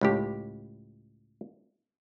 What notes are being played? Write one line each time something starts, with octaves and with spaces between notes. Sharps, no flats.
C#2 A2 G4